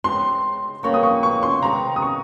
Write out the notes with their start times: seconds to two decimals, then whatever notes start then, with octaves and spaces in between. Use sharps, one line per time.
0.04 C#3 G#3 C4 D#4 C6
0.83 C#3 G3 A#3 F4 C#6
0.94 D#6
1.03 C#6
1.23 C#6
1.43 C6
1.62 C3 D#3 G#3 C4 D#4 A#5
1.96 D#6
2.02 C#6